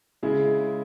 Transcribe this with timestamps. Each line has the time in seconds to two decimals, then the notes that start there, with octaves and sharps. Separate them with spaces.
0.23 C#3 G#3 E4 G#4